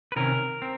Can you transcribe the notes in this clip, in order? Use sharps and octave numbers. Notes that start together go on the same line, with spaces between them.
B4
C3 D#3 C#4 A#4
C4